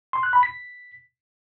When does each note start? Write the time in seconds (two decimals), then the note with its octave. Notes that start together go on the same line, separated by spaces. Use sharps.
0.13 C6
0.23 F#6
0.33 B5
0.43 B6